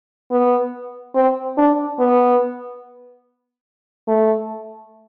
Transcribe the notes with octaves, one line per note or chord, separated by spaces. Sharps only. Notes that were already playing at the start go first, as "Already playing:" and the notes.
B3
C4
D4
B3
A3